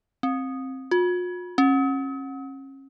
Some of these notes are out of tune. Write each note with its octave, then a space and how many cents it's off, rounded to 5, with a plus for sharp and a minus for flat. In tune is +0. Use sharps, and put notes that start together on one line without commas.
C4 +15
F4 +45
C#4 -35